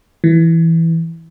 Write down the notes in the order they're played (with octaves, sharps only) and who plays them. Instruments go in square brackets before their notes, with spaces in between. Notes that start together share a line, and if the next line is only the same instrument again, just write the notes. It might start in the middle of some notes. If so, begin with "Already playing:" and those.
[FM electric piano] E3